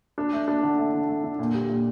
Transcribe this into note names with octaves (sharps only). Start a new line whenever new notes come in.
D4
A3
D4
D3
A3
D3
A3
D3
A#2
G3
A#2